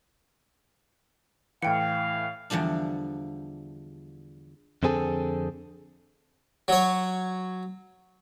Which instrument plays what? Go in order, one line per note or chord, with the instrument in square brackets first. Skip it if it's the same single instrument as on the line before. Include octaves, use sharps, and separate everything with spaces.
[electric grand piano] A2 E3 [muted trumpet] F5 [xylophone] G5 C#7
[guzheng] E2 D3 F3 G3 D4
[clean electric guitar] F2 D3 C4 G#4 A4
[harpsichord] F#3 C#5